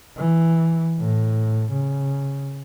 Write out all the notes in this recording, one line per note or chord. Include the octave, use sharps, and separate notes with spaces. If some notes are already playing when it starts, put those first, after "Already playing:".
E3
A2
C#3